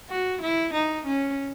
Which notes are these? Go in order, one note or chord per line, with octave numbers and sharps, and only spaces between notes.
F#4
E4
D#4
C#4